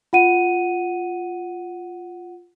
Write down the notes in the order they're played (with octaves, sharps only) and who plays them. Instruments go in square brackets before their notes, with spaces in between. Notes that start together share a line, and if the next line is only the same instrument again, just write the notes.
[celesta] F4 F#5 D#7